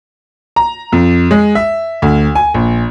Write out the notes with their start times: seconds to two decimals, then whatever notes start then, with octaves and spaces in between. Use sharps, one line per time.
0.56 A#5
0.92 F2
1.31 G#3
1.55 E5
2.02 D2
2.35 G#5
2.54 A#1